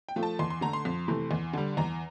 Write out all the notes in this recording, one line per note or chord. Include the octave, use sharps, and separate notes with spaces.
G5
F3 A3
A5
E2 C6
C6
D3 A3 A#5
C6
F2
C3 E3 A3
E2
D3 G3
E2 A#5